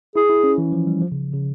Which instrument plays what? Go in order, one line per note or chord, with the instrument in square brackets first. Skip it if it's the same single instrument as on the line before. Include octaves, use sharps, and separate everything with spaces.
[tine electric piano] E4 [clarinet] G#4
[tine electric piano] E4
C#4
E3
F3
G3
F3
C#3
C#3